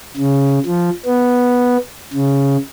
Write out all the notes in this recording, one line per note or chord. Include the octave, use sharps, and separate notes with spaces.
C#3
F3
B3
C#3